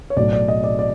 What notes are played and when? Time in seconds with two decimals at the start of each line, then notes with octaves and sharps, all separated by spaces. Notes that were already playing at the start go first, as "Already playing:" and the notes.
0.10 C#5
0.17 B1 A2 F#3 D5
0.33 D5
0.48 D#5
0.64 D5
0.79 D5